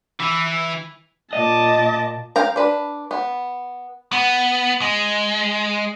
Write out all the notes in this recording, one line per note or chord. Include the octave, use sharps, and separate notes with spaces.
E3
A#2 D#5 A5 D6
F5 G5 A#5
D4 B4
B3
B3
G#3